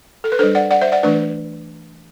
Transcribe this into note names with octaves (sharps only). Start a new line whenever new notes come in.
A4
B4
G3 D4 A4 C5
D5 F#5
D5 F#5
C5 E5
D5 F#5
E3 A3 D4 B4 D5